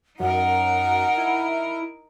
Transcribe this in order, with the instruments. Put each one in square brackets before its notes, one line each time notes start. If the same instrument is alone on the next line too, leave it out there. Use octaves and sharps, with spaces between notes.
[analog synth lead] F#2 [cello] D#4 A#4 [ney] F#5
[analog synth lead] E4